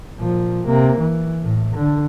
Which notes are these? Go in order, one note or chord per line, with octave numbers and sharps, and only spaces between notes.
A#2 F3
C3 A#3
E3
A2
D3